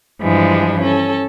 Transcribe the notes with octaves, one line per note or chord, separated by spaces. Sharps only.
G2 E3 F3 G#3 D4
C#4 A4